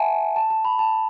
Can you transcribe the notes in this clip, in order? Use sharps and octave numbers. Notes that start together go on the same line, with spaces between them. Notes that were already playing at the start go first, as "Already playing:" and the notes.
Already playing: E5 F#5 G#5 A5
A5
A5
B5
A5